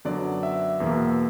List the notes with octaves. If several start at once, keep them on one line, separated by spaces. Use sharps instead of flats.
F#2 D3 F#3 B3 D5
E5
E2 B2 A#3